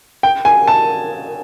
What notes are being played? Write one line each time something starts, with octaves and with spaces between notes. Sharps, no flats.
G5
G#5
A5